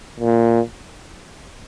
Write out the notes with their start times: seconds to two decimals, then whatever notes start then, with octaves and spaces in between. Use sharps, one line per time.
0.20 A#2